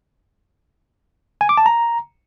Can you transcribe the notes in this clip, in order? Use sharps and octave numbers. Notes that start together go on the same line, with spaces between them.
G#5
D6
A5
A#5